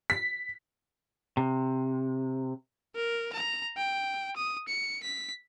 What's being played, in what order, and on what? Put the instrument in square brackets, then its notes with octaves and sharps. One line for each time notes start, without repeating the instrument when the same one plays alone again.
[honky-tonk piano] B6
[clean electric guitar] C3
[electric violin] A#4
A#5
G5
D#6
C#7
B6